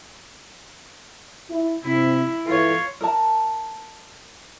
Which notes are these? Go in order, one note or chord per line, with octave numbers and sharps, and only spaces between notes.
E4
C3 E4
E3 F4 A4 C#5
A#4 A5